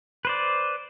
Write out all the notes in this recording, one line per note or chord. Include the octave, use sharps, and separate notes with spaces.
B4 C5 D5